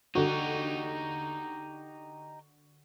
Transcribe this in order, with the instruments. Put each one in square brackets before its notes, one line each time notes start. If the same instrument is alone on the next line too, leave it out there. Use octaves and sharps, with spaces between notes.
[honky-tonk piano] D3 F#4 [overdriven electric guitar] D#4 G4